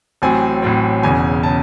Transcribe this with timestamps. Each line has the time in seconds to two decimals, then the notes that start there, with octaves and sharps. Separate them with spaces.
0.22 A1 A2 F#3 C4 G#5
0.62 A1 A2 F#3 C4
1.03 E1 E2 C#3 G#5
1.43 C#3 A5